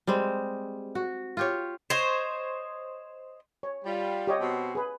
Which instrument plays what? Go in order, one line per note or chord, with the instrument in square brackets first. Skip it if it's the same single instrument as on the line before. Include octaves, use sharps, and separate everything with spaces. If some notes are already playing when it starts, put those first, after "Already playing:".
[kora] G3 G#3 C4
F#4
F4 G4 C#5
[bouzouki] C5 C#5 D#5
[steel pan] C#5
[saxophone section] G3 F4
[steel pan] G4 C#5 D#5
[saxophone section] B2 C4 F#4
[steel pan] G#4 B4